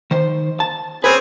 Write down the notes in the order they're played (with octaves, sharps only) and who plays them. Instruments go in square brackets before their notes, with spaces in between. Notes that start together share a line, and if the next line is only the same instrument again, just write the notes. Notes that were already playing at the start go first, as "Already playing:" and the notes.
[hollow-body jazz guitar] D#3 C5
A5
[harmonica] C4 C#4 G#4 [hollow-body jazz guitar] B4